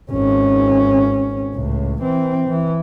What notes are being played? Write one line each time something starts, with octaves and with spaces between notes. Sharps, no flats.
G#1 C#4
C#2 A2
E3 C4
E3